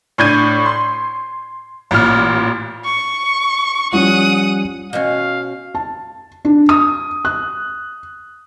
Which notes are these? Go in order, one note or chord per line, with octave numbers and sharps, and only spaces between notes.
A2 D4 G6 G#6 D#7
C6
A1 A#2 F6
C#6
F3 G3 C#4 F#5 D#6
B2 C#4 F5
A5
D4
D#6
F#6